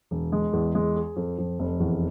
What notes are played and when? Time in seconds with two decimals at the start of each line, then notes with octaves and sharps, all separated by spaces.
0.11 E1
0.32 G#3
0.53 E2
0.75 G#3
0.96 G#4
1.16 F2
1.38 F2
1.59 F1
1.80 E2